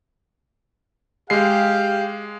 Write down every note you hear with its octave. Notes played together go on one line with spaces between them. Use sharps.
G#3 G4 F5 C7